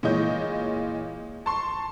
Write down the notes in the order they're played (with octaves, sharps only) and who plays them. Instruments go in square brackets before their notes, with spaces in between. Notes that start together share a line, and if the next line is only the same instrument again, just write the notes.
[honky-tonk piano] A#2 E3 G#3 C#5 D#5 G6
A5 C6 C#6